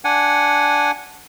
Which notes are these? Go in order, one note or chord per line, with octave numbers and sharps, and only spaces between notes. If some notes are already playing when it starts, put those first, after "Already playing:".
D4 F#5 G#5